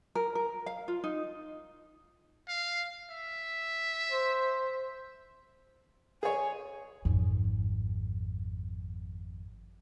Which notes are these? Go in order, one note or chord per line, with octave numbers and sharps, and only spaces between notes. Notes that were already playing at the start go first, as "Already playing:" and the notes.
A#4
A#4
F5
F4
D#4
F5
E5
C5
G#4 C#5 G#5
G#1 F2